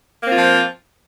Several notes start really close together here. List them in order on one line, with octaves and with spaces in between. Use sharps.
A#3 C4 F4 F3